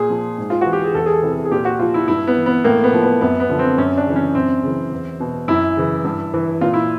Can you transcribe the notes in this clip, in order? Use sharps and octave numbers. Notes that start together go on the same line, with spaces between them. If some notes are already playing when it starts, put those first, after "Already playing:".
Already playing: A#2 G#4
F3
G#2
F4
E3 F#4
G4
G#4
E2 A4
G#4
A4
C3 E3
A4
G#4
A#2 G4
F#4
F3 F4
E4
G2 E4
B3
E3
B3
A2 A#3
B3
F3
B3
F#2 B3
B3
D3 F3
C4
F#2 C#4
D4
C#3 E3
C#4
F#2 C4
C#3 E3
E2
B2
F#2 E4
C#3 E3
G2
E3
A#2 F4
E4